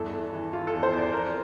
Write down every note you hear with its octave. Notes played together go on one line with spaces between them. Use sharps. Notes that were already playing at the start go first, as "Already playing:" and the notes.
Already playing: E2 G2 A4
E2
E3
E3 F4
A4
E2
C5
E2
D5
F2 A#4